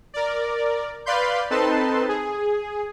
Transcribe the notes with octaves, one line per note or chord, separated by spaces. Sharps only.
A#4 D5
B4 D5 F5 B5 C6 G6
C4 D#4 A4 B4 A5 C6
G#4